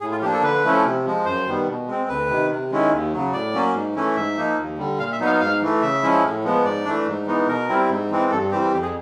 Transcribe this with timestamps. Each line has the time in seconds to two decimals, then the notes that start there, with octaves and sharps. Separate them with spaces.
0.01 A2 G#4
0.11 F4
0.22 F3 A#3 D4 G4
0.33 A4
0.42 D3 B4
0.64 F3 A3 C#4 E4
0.85 C3
1.05 F3 G#3
1.25 F#2 C5
1.47 D#3 G3 B3
1.68 B2
1.88 G#3 C4
2.09 D2 B4
2.29 C3 D#3
2.50 C3
2.71 D#3 G#3 C#4 E4
2.92 D#2
3.13 C#3 F#3
3.33 A2 D5
3.54 F#3 A#3 C#4
3.74 G#2
3.96 E3 A3 C#4 E4
4.16 G#2 E5
4.37 F3 A#3 D#4
4.58 D#2
4.78 D3 G3
4.99 A#2 F5
5.12 E5
5.20 F#3 B3 D#4
5.26 F5
5.40 G#2 F5
5.62 E3 A3
5.82 C#3 E5
6.03 F3 G#3 C#4 E4
6.24 A2
6.44 F3 G#3 B3
6.64 G#2 D5
6.85 E3 A3 D4
7.06 G#2
7.27 E3 G#3 B3 D#4
7.47 B2 A#4
7.69 G3 C4 E4
7.89 G#2
8.11 E3 G#3 C4
8.31 G2 A4
8.51 E3 G3 C4 G4
8.72 F2 G4
8.82 G#4